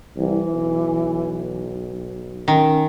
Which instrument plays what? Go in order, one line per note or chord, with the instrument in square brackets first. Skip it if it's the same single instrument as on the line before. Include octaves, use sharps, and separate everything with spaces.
[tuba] C2 [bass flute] E3
[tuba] B1
[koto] D#3 [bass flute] C#4